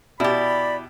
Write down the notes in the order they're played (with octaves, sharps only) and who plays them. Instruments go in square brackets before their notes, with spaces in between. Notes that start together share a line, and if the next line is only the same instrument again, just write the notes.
[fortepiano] B2 [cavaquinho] E4 G4 [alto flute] D5 [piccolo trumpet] B5